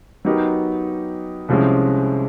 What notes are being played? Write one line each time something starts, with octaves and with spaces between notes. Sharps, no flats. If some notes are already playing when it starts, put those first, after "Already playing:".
F#3 B3 D#4 G4 A#4
C2 C3 F3 G#3 C#4